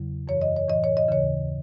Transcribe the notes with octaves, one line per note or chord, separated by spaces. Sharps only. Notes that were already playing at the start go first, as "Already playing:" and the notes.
Already playing: E2 C#3 F#3
F#2 E3 C#5
D#5
C#5
A2 E3 D#5
C#5
D#5
D#2 C#3 E3 C#5